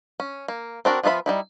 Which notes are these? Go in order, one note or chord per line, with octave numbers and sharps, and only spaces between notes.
C#4
A#3
C4 D4 F#4 A#4
F3 B3 F4 E5 B5
G3 D#4 E4